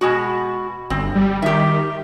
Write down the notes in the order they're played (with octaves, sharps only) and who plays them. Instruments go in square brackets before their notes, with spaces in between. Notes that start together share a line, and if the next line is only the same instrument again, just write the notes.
[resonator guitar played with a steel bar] B2 G#3 F#4
[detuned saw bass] G1 [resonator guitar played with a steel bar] C4
[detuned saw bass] G3
[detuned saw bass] D#3 [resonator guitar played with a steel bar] G4 E5